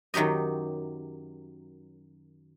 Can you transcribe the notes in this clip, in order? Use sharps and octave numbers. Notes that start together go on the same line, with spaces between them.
F#2 D#3 F#3 G4 D#5